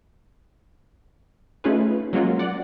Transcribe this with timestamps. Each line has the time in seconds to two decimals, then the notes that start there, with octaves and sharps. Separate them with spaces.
1.64 A3 C#4 D#4 F4 G#4 B4
2.13 F#3 G#3 A#3 C#4 F4 F#4
2.39 D5 F#5